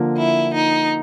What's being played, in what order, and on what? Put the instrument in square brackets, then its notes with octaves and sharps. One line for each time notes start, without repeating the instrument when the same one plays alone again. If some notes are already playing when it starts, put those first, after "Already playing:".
Already playing: [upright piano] D3 F3 A#3
[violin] E4
D#4